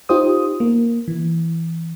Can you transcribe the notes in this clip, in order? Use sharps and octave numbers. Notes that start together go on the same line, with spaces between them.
D#4 F4 G4 C5 D#6
A#3
E3